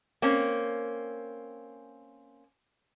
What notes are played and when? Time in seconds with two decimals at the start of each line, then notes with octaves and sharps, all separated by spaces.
0.22 A#3 C4 C#4